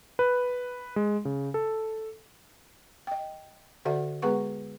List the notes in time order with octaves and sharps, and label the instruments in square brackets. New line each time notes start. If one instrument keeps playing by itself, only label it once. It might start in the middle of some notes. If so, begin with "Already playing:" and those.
[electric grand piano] B4
G#3
C#3
A4
[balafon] D#5 G5
D3 F#4 A4 D5 E5 F#5
G#3 B3 G#4 B4 F#5 C#6